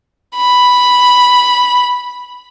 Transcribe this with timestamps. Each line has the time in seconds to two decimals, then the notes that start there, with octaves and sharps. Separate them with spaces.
0.36 B5